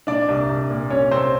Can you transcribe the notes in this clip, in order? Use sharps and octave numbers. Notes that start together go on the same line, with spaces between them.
A#2 D4 D5
C2
C2
A#2
C2 C#4 C#5
C2 C4 C5